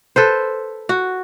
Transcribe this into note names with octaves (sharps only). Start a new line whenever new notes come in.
A4 B4 C5
F#4